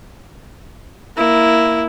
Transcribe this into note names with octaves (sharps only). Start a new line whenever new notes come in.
A#3 E4